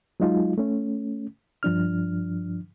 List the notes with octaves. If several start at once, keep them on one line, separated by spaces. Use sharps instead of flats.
F#3 G#3 D#4 F4
A3 C#4
G2 F3 D4 F6